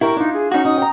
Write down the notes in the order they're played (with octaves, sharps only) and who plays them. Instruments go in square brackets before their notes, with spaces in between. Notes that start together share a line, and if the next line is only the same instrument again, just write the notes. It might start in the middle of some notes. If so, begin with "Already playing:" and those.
[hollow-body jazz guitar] E4 [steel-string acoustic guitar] G4 A#4 E5 [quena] C#6
[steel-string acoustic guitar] D4 F4 [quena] D#4
[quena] G#4
[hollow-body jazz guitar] C#4 F#4 [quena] D#4
[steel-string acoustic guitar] D#4 [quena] D#6
[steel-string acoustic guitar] G5 A#5